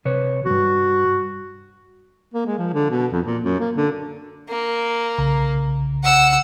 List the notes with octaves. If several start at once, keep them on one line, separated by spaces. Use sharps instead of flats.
C3 B4 C#5
E2 G2 F#4
A#3
G#3
F3
D3
B2
F2
A#2
F#2
A#3
D3
A#3
B1 C#3 A#5
F#5 E6